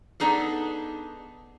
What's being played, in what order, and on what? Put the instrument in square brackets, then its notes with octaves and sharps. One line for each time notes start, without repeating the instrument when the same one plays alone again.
[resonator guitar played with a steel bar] B3 D4 D#4 G#4 A4